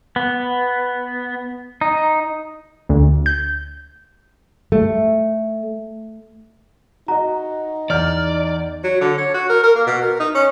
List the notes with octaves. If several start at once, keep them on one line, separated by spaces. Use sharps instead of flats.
B3
D#4
D2
G6
A3
D#4 F#4 D#5 A#5
E2 D5 F6 G6
F#3
D3
C#5
F#4
A#4
A#4
A#3
B2
A#4
D#4
C#4